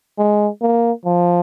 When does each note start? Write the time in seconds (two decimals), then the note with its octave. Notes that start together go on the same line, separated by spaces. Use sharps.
0.18 G#3
0.61 A#3
1.05 F3